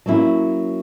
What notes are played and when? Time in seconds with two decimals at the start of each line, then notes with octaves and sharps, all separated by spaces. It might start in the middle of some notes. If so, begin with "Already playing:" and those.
0.06 F#3 A#3 C#4 E4